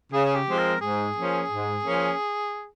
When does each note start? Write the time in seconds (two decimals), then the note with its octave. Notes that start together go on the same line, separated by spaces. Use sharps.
0.13 C#3 G#4
0.25 G#4
0.35 G4
0.47 F3 G#3 C4
0.58 A#4
0.81 G#2 G#4
1.15 F3 A#3 C#4
1.50 G#2
1.84 F3 A#3 C#4